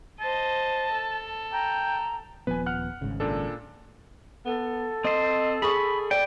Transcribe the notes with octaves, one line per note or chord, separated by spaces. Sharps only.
C5 D#5 A5
A4
G5 A#5
D#1 F3 B3 B4 G#5
F#5 F6 F#6
G#1 G#2 C#3
A#2 D4 A4
B3 A4
C4 C5 D#5
G#4 B5 C#6 D#6
D5 G5